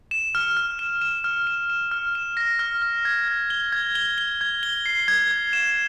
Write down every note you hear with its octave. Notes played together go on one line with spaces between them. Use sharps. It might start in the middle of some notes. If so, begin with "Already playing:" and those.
E7
F6
F6
E7
E7
F6
E7
E7
F6
E7
A#6
F6
F6
G#6
G#6
G7
G#6
G7
G7
G#6
G7
C7
G#6
G#6
E7